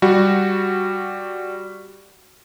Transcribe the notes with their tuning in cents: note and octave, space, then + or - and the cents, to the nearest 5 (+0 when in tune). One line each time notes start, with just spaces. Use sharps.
G3 +0 F#4 +0